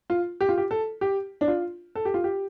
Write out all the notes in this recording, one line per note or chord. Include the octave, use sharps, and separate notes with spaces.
F4
G4
F4
G4
A4
G4
D4
F4
A4
G4
F4
G4